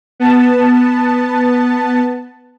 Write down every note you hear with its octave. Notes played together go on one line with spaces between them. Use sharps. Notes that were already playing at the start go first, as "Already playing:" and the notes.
B3 A5